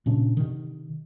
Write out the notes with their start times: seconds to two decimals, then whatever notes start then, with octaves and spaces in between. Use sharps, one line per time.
0.06 A#2 C#3 C#4 D4
0.37 C3 D#3